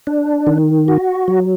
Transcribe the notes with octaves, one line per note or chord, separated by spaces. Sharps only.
D4
D#3
F#4
F#3